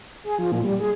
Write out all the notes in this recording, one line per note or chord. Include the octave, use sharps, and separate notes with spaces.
G#4
F3
A#2
G3
G#4